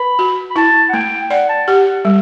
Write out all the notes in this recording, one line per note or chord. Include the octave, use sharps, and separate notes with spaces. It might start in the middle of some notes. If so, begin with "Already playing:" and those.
Already playing: B4 B5
F#4
B5
E4 A5
F#5
A3 G5
D5 F#5
A5
G4 F#5
F#5
G3